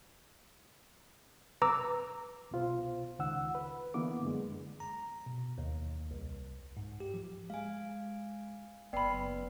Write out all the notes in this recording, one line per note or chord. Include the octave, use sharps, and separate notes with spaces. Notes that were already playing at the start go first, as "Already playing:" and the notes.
B4 A#5 D6 E6
C2 B2 F4 C5
C#2 D#3 F#5 E6
B4
D3 E3 A#3 B3 D6
F#2 D3 G#3
A#5
B2
D#2
C2
G#2
G4
F3
G#3 F5 G#5
F#1 B3 B4 D5 G5 B5 C7